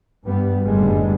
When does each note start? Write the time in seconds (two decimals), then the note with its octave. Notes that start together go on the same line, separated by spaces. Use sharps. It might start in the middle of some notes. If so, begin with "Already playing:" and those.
0.25 G2 G3 B3
0.63 F#1 A2 D3 G3 G#3 B3